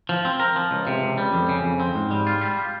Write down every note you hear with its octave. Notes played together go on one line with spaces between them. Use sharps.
F3
C4
A#4
F3
C#2
C3
C#2
G3
F2
C#3
F2
C4
G#2
G3
F4
G3